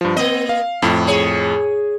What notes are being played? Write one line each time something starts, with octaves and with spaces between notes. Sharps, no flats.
G2 F3
A#3 C4 D#5
F5
F2 A2 E4
G#4 C#5